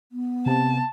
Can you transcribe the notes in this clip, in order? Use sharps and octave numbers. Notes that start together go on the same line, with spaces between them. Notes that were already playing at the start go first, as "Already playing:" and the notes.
B3
C3 A5